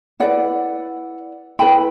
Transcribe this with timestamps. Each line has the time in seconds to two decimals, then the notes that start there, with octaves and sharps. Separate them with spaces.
0.20 E4 B4 D5 F#5
1.59 E4 G4 B4 G5 B5